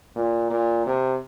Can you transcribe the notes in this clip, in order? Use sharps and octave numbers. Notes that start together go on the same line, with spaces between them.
A#2
A#2
C3